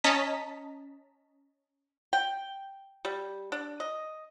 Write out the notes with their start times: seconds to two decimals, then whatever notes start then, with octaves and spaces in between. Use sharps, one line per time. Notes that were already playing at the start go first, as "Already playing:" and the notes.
0.04 C#4 D#5 A5 A#5 B6
2.13 G5
3.05 G3
3.52 D4
3.80 D#5